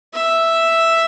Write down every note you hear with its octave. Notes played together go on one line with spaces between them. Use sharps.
E5